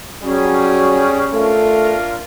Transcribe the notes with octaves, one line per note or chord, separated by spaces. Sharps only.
F#3 G3 C#4 G#4
A3 D4 F4 A#4